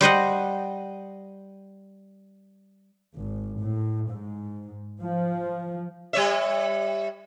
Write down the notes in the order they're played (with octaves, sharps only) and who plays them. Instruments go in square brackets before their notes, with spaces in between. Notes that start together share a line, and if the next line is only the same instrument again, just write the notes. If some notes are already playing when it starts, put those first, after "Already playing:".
[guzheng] G3 C5 D#5 F#5
[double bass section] G#1
A2
G#2
F3
[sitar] G3 C#5 E5